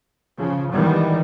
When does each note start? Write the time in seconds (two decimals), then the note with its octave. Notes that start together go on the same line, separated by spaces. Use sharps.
0.39 C#3 F3
0.73 D#3 E3 G3 G#3 B3